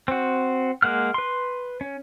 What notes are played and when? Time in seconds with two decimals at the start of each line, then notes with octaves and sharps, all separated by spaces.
0.08 C4 F#4
0.82 G#3 A#3 F#5 F6
1.14 B4 C6
1.81 C#4